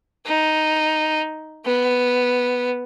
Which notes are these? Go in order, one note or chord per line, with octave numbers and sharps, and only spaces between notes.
D#4
B3